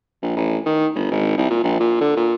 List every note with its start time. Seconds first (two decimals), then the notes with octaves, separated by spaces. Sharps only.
0.22 A#1
0.36 A1
0.66 D#3
0.95 G1
1.11 G#1
1.37 C2
1.50 A#2
1.63 A#1
1.80 A#2
2.00 D3
2.16 A#2